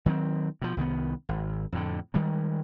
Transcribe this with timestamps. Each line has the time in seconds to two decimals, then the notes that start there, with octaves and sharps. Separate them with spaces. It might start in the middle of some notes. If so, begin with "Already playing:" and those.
0.06 D#3 F#3 B3 C4
0.62 B2 F3
0.77 C2 D#3 F3 B3
1.29 G#1
1.72 F2 A2 D3
2.14 D#3 G3 G#3